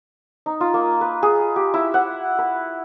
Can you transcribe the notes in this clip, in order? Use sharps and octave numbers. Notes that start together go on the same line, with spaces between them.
D#4
F4
A#3
B4
G#4
G4
E4
F#5
B4